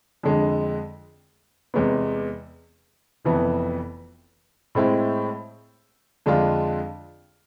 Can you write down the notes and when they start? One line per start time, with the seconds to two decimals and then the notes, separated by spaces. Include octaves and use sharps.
0.23 F2 D3 G#3
1.74 E2 C3 G#3 B3
3.24 F1 F2 E3 B3
4.75 A2 G#3 C4 E4
6.26 F2 D3 G#3 D4 F4